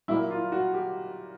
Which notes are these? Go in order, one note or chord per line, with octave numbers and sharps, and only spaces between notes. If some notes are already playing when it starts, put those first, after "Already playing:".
A#2 F#3 A#3 E4
F4
F#4
G4